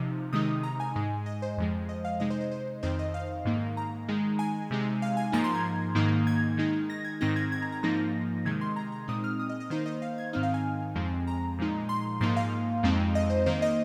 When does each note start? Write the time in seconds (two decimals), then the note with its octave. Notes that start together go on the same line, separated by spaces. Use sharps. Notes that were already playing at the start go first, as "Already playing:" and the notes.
Already playing: C3 F3 D#4
0.33 C3 D#3 G#3 D#4 D#6
0.63 A#5
0.80 G#5
0.96 G#2 G#3 D#4
1.26 D#5
1.42 C5
1.58 F2 F3 G#3
1.89 D#5
2.05 F5
2.20 C3 G#3 D#4 D#5
2.30 C5
2.41 C5
2.51 C5
2.83 F2 D#3 C4 D#4 C5
2.99 D#5
3.14 F5
3.45 G#2 D#3 A#3 D#4
3.77 A#5
4.08 D#3 G#3 D#4
4.39 G#5
4.71 C3 G#3 D#4
5.02 F5
5.17 G#5
5.32 G#2 F3 A#3 D#4 A#5
5.44 C6
5.54 G#6
5.95 G#2 D#3 A#3 D#4
6.27 G#6
6.57 D#3 G#3 D#4
6.90 A#6
7.04 G#6
7.21 G#2 D#3 C4 D#4 A#6
7.36 G#6
7.52 G#6
7.62 A#5
7.72 A#5
7.83 G#2 F3 A#3 D#4 A#6
8.45 C3 D#3 G#3 D#4 G#6
8.61 C6
8.76 A#5
8.92 A#5
9.08 A#2 G#3 C4 D#4 D#6
9.24 F6
9.39 D#6
9.49 D#5
9.60 D#5
9.70 D#3 A#3 D#4 C5
9.86 D#5
10.02 F5
10.18 G#6
10.33 G#2 D#3 C4 D#4 F6
10.43 F5
10.54 G#5
10.95 F2 F3 G#3 C4
11.27 A#5
11.59 A#2 F3 G#3 D#4
11.89 C6
12.20 G#2 F3 A#3 D#4 C6
12.37 F5
12.83 F2 F3 G#3 C4 D#4
13.15 D#5
13.30 C5
13.46 D#3 A#3 D#4 C5
13.62 D#5